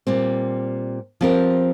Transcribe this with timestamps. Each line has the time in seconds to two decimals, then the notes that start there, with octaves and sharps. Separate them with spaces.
0.07 A#2 G3 C4
1.21 F3 C4 G4 A#4